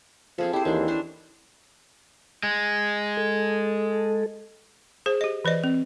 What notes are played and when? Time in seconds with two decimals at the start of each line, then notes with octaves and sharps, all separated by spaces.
0.38 F3 C4 G#4 A4
0.53 E4 G4 C5
0.65 D#2 E3 D4
0.88 C#4 D4 C5
2.43 G#3
3.17 A4
5.06 G#4 C5
5.21 G4 D#5
5.45 E3 B4 D5 D#5
5.64 C4